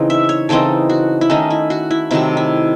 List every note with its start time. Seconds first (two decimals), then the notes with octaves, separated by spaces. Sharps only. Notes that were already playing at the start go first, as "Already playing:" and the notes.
Already playing: C#3 E3 C4 D#4
0.10 E5
0.29 C#5
0.49 C#3 E3 C4 D#4 A4
0.90 F#4
1.21 E4
1.30 D#3 A3 C#4 D#4
1.50 E4
1.70 F#4
1.91 E4
2.11 C3 D#3 F#3 A3 E4
2.37 E4